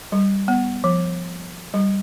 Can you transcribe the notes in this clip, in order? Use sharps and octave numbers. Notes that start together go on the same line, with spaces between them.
G3
B3
F3
G3